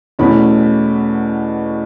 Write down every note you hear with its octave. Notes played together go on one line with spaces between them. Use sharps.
E2 B2 A3 C#4 B5